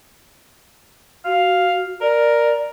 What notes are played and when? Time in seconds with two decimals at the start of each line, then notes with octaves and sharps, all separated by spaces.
1.25 F#4 F5
2.01 A#4 D5